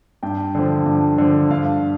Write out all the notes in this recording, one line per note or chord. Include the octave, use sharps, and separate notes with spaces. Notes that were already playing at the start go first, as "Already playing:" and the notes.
G2 G5
D3 F3
G2
D3 F3
G2 F5